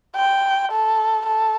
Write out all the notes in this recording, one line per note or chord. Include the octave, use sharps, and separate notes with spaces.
G5
A4
A4